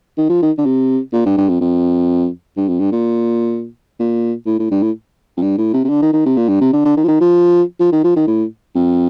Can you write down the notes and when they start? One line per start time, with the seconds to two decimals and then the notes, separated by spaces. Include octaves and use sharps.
0.18 D#3
0.30 F3
0.42 D#3
0.58 D3
0.66 C3
1.13 A#2
1.26 G2
1.37 G2
1.49 F2
1.61 F2
2.57 G2
2.68 F2
2.79 G2
2.92 A#2
3.99 A#2
4.46 A2
4.59 A2
4.71 G2
4.82 A2
5.37 F2
5.42 G2
5.58 A2
5.74 C3
5.84 C3
5.89 D3
6.02 D#3
6.13 D#3
6.26 C3
6.37 A#2
6.49 G2
6.61 C3
6.73 D3
6.85 D3
6.97 D#3
7.04 F3
7.08 D#3
7.20 F3
7.80 F3
7.92 D#3
8.04 F3
8.16 D#3
8.27 A2
8.75 F2